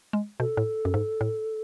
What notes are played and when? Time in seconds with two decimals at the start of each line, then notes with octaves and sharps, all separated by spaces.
0.13 G#3
0.40 B2 A4
0.57 A2
0.85 F#2
0.94 G#2
1.21 A2